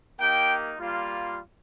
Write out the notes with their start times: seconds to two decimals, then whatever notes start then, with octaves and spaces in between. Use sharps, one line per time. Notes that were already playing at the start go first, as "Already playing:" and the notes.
0.19 A#3 D#4 G4 G5
0.79 G3 A#3 F4